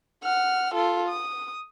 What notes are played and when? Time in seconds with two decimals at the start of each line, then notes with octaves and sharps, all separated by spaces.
0.23 F#5 F6
0.74 F4 A4
1.09 D#6